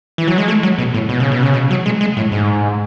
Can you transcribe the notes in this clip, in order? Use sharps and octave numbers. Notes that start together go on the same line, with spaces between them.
E3
F#3
G#3
A3
F#3
B2
A2
B2
C#3
B2
C#3
B2
F#3
G#3
G#3
A2
G#2